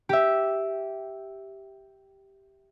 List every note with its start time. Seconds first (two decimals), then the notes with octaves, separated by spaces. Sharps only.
0.09 G4 E5